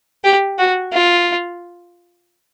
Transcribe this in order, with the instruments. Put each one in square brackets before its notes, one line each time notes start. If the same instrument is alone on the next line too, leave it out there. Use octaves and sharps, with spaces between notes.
[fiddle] G4
F#4
F4